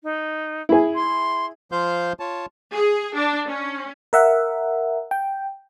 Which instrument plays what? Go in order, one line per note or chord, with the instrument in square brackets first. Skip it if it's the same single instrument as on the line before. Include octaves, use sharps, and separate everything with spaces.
[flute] D#4
[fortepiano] E4 G#4
[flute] C6
[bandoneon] F3 F4 C5 F5 G6
F4 C#5 A5
[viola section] G#4
D4
C#4
[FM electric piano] A#4 E5 F#5
G5